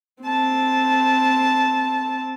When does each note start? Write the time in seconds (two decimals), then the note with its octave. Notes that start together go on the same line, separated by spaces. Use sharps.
0.23 C4 A5